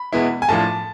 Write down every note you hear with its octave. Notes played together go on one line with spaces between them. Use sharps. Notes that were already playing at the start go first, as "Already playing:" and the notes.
Already playing: B5
E2 B2 G#3 B3 E4
G#5
A2 F3 A3 D4 F4 A5